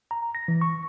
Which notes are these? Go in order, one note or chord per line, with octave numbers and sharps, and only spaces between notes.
A#5
A#6
E3
C#6